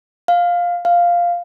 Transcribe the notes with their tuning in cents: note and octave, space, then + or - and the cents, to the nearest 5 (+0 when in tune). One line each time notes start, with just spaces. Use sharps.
F5 +10
F5 +0